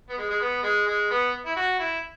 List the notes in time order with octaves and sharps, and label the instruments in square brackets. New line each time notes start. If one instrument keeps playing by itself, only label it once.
[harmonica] B3
G#3
G#3
B3
G#3
G#3
B3
E4
F#4
E4